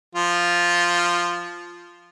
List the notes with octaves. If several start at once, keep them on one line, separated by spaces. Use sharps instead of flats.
F3 F4